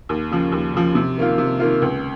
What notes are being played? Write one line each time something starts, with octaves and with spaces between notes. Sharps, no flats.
D#2
C#3 F3
D#2
C#3 F3
C3
D#3 A#3 F4
C3
D#3 A#3 F4
C#2